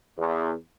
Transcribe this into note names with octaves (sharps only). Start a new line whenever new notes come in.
E2